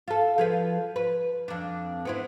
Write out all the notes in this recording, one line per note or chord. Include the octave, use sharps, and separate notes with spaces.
F4 A4
F3 G#4 B4
B4
F2 D4
B3 C4 E4